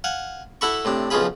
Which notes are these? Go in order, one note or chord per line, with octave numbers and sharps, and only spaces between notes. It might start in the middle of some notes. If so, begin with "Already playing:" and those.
F5 F#5 G#5
E4 F#4 A4 A5 B5 C#6
A2 C3 D4
B1 C#3 F3 F4 G#4 B5